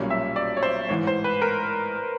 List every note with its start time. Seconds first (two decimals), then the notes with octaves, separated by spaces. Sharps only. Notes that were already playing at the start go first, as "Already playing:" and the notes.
Already playing: B1 A#2 G3 A#3 C#4
0.10 E5
0.36 D5
0.57 C#5
0.63 C5
0.89 A1 G#2 E3 C#5
1.07 C5
1.24 B4
1.42 A#4